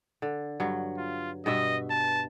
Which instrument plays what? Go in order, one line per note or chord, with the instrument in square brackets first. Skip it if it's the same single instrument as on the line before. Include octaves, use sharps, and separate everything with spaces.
[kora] D3
G2 F#3
[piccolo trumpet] F4
[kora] G2 B2 E5 [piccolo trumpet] D#5
[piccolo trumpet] A5